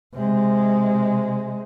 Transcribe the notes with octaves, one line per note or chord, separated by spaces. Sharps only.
C3 G#3